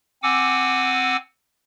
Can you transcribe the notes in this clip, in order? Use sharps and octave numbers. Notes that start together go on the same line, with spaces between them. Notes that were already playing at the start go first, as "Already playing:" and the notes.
C4 F#5 G#5 D6 E6